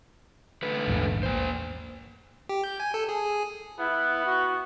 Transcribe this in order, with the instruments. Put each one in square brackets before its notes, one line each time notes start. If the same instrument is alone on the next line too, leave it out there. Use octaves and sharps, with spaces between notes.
[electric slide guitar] D3 A3 B4
[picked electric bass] A#1 E2 G#2
[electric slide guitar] A#3 C5
[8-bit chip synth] G4
G6
G#5
A4
G#4
G#4
[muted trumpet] B3 [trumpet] E4
[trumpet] F#4